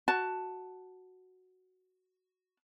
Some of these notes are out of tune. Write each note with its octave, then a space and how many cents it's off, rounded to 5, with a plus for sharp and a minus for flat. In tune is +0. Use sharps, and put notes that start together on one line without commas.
F#4 +0 A5 +0